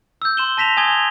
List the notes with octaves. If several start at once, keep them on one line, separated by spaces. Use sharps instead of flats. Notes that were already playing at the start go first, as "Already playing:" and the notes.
E6 G6
C6 E7 G7
A5 A#6 B6 E7 F7
G#5 D#6 G#6 G7
G#5 F7